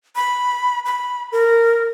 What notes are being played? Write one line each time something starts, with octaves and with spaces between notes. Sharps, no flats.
B5
B5
A#4